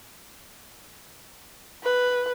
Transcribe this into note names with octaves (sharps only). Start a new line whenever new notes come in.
B4